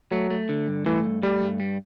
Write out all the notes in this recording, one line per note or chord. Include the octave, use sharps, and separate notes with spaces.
F#3 A3
A3
D3
G2
E3 A3
G2
G3 A3
G2
G3